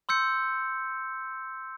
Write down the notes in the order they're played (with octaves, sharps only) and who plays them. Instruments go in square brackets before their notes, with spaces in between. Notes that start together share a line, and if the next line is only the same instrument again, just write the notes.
[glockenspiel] C6 E6 G6 C#7